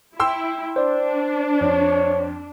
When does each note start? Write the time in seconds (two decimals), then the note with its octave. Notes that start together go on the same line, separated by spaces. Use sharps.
0.20 E4 G5 C6 E6
0.76 D4 C5 D5
1.61 F2 C#5